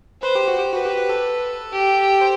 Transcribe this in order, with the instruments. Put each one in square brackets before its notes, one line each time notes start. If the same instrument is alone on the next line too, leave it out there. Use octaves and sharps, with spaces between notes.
[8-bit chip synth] B4 [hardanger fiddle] C5
[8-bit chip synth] G4
F#4
G4
[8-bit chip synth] F#4 [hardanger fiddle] B4
[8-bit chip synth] G4
G4
A4
[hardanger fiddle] G4
[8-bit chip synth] C5